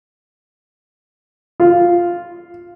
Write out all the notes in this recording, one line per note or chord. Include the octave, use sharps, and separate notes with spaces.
F4